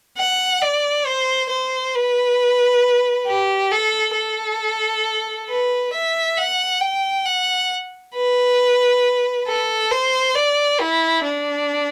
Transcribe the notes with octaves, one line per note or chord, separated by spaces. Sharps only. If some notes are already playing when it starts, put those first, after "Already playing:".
F#5
D5
C5
C5
B4
G4
A4
A4
B4
E5
F#5
G5
F#5
B4
A4
C5
D5
E4
D4